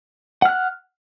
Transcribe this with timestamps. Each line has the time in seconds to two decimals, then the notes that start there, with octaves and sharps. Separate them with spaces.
0.42 F#5
0.45 F6
0.49 F#6